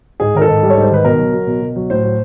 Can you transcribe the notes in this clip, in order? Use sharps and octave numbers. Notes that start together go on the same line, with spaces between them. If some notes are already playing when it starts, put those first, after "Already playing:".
G#2 G#4
D#3 A#4
A4
G#2
G3
C#5
G#2 C5
D#3 B4
B2 A#4
F#3
F#3
B2
B2
F#3
A2 C5
F#3